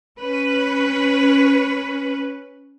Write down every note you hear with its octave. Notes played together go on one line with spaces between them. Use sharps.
C#4 B4